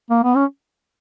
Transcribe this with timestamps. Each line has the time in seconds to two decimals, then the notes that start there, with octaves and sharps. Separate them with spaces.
0.10 A#3
0.24 B3
0.36 C#4